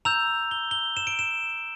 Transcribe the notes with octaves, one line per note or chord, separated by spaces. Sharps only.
A#5 E6 G6 F7
G7
G7
E7
D7
E7